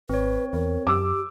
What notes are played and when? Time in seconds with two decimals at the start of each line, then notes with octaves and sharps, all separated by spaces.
0.09 G#1 C4 B4 C#5
0.53 E2 A#4
0.87 F#2 G4 D6 E6